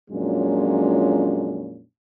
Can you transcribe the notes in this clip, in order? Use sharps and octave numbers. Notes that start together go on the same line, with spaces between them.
F2 A#2 F#3 G#3 C#4 D4